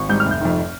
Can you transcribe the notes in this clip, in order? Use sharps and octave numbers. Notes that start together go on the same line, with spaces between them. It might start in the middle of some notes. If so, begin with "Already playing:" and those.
Already playing: G#1 C#6
G#2 G3 G6
F6
F1
G6
F2 D#3